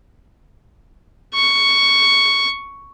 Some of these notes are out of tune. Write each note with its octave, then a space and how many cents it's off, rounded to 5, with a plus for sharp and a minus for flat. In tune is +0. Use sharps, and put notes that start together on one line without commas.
C#6 +5